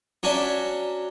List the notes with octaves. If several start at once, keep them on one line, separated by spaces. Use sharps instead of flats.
F#3 C#4 D4 E5